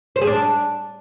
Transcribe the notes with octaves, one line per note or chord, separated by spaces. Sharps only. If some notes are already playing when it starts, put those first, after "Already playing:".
C5
G#4
D4